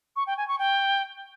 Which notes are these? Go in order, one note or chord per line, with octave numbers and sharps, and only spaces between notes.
C#6
G5
G#5
C#6
G5